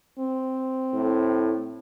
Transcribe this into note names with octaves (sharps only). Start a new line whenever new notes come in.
C4
A2